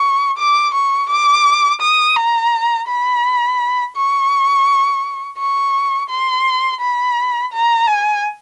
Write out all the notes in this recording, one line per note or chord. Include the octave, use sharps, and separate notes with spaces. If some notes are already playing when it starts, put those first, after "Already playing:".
Already playing: C#6
D6
C#6
D6
D#6
A#5
B5
C#6
C#6
C6
B5
A#5
G#5